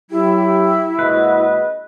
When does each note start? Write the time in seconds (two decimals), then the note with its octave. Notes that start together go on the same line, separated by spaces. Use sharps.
0.11 F#3 E4 G4
0.99 A#1 G#3 F#4 B4 D#5